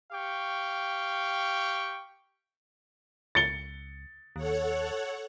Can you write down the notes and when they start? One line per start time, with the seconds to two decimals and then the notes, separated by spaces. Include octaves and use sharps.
0.12 G4 F5 G5 C#6
3.35 C#2 A6 C#7 G7
4.36 D#2 A4 C#5 F#5